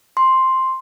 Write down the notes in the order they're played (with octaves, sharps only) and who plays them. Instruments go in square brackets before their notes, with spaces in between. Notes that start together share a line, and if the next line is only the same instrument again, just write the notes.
[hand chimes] C6